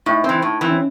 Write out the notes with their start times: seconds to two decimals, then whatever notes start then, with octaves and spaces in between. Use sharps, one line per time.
0.06 A2 D#4
0.24 E3 C4
0.42 A2
0.61 E3 C4
0.71 C#4